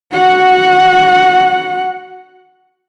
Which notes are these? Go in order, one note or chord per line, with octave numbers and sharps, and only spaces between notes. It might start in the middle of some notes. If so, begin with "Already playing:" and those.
F#4 F#5